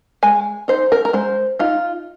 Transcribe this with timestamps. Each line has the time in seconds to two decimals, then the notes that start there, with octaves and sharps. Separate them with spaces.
0.23 G#3 G#5
0.68 D#4 C5
0.92 A#4
1.05 A#4
1.13 G#3 C5
1.59 D#4 F4